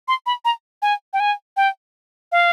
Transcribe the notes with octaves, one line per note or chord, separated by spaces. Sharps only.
C6
B5
A#5
G#5
G5
G#5
G5
F5